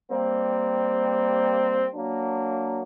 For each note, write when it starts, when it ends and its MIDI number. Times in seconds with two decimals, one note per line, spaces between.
0.10 1.86 55
0.10 1.86 58
0.10 1.86 60
1.95 2.83 54
1.95 2.83 58
1.95 2.83 62